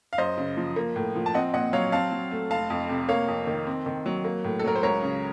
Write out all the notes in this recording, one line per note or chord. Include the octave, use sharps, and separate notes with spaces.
F5
F#2 C5 D#5
C#3
F3
A#3
A2
F3
A5
C4 D#5 F#5
A#2 D#5 F#5
F#3 C#5 F5
C4 F5 A5
F#3
A3
F1 F5 A5
F2
C3
A#3 C#5 F5
F2
D#3
C4
D#3
F#3
A#3
A2
A4
F#3 A#4
C5
C#2 A#4 C#5
C#3